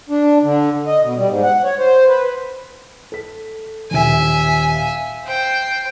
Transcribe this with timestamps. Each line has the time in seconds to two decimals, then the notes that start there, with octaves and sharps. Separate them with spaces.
0.09 D4
0.43 D3
0.87 D#5
1.02 B2
1.16 G3
1.28 G#2
1.43 F#5
1.64 C#5
1.79 C5
2.08 B4
3.12 A4 B6
3.91 D#1 D#3 E5 G#5
4.75 F5
5.25 C5 G5